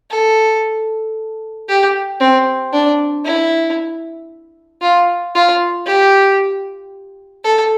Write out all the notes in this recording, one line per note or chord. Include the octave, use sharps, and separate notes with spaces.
A4
G4
C4
D4
E4
F4
F4
G4
A4